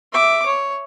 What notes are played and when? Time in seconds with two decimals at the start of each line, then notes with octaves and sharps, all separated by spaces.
0.13 E5 D6
0.46 C#5